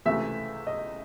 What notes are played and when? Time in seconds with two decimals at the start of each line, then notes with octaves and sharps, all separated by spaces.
0.06 C#2 C3 E3 A3 E5
0.67 D#5